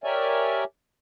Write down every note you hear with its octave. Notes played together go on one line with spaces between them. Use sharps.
G4 A#4 C#5 D5 E5 G#5